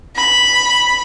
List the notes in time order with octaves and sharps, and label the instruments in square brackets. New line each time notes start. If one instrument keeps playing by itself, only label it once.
[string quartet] B5